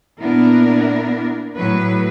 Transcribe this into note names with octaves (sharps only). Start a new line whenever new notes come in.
A#2 B3 D4 E4 A#4
A2 F#3 B4